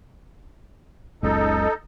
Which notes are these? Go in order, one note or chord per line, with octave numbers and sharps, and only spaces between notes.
F#1 C#2 D#4 A4